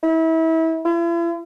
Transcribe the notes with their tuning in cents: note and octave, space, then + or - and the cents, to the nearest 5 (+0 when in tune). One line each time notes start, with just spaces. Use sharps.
E4 -30
E4 +45